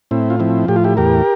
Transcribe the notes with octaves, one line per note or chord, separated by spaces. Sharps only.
A2 C4 E4
F4
F3 C4 E4
A2 G4
F4
E4 G4
E2 G4 A#4